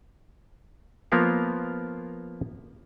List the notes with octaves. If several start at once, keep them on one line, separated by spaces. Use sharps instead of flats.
F3 A#3 B3 A#4 F5